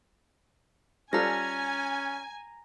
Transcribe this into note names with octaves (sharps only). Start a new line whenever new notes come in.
G3 C#4 F4 A4 G#5 A#5 A#6